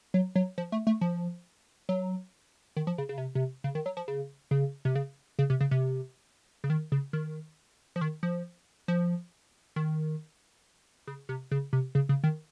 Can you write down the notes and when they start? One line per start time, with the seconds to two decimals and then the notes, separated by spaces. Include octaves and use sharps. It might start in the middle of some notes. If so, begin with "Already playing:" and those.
0.14 F#3
0.36 F#3
0.58 F3
0.72 A3
0.87 A3
1.01 F3
1.89 F#3
2.77 D#3
2.87 F3
2.98 C#3
3.09 C#3
3.18 C3
3.35 C3
3.64 C#3
3.75 D#3
3.86 F#3
3.97 F3
4.08 C#3
4.51 C#3
4.85 C3
4.95 C#3
5.39 C#3
5.50 C3
5.61 C#3
5.71 C3
6.64 C#3
6.70 D#3
6.92 C#3
7.13 D#3
7.96 F3
8.01 D#3
8.23 F3
8.88 F3
9.76 D#3
11.07 C#3
11.29 C3
11.51 C#3
11.73 C3
11.95 C#3
12.09 C#3
12.24 D#3